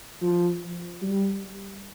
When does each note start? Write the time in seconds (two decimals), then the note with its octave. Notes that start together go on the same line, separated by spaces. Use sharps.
0.22 F3
1.02 G3